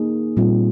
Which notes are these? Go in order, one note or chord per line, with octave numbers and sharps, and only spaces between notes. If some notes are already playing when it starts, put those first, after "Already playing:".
Already playing: A#3 D#4 G#4
A#2 G3 C4 F4